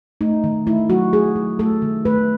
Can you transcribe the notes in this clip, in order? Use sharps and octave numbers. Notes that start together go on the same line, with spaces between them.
A3 D#4
D#3
A3 E4
F#3 F#4
A3 G#4
F#3
A3 A4
D#3
A3 B4